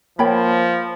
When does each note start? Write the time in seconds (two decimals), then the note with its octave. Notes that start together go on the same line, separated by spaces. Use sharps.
0.19 F3 A#3 C#5 G5 B5